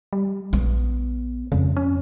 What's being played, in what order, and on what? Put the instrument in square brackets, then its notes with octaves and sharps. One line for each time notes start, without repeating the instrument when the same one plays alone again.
[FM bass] G3
[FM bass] A#1 [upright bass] B3
[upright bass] F2 [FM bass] C#3
[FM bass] C#4